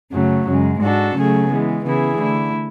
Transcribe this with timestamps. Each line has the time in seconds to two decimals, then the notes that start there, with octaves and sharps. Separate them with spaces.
0.12 F#2 C#3 F#3 A3
0.47 F#2 C#3 G#3
0.81 G#2 G#3 D4 F#4 A4
1.16 C#3 F#3 A3 C#4 G#4
1.49 E3 G#3 B3
1.83 C#3 E3 B3 E4 G#4
2.18 D3 A3 E4